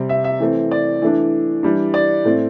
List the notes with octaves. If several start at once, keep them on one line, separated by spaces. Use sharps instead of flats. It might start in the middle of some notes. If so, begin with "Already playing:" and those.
Already playing: C3 G3 C4
E5
E5
E3 A3 C4
D5
E3 A3 D4
E3 G3 D4
D5
A2 A3 C4